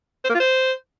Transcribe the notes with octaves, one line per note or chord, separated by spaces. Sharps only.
C5
A#3
F4
C5